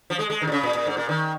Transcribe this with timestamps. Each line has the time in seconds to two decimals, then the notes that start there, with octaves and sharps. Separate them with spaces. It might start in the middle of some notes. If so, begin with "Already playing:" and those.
0.10 F3
0.19 G#3
0.30 G#3
0.42 D#3
0.47 A#2
0.52 C#3
0.63 A#2
0.75 A#2
0.87 G#2
0.97 A#2
1.09 D#3